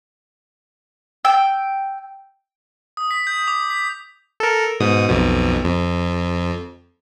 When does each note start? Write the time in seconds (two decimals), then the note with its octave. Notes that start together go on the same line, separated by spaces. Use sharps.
1.25 G5 E6
2.97 D#6
3.11 B6
3.27 G6
3.48 D6
3.70 B6
4.40 A4 A#4
4.80 G#2 B2 D#6
5.09 B1 F2 B2
5.64 F2